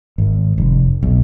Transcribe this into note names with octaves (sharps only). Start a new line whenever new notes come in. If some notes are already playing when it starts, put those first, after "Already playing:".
G#1
F1
B1